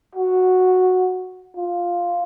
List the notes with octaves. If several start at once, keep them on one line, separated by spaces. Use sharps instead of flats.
F#4
F4